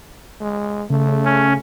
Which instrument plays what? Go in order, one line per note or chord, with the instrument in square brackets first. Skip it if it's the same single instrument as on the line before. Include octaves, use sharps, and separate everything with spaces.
[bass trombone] G#3
[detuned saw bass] C#3 [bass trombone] A3
[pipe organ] C#4